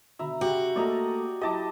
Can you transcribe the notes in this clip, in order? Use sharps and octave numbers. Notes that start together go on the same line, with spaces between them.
B2 D3 E5 A#5 B5
C#3 F#4 G4
A3 A#3 A4 D5 D#5 A#5
F#3 E4 G4 D#5 A5 D6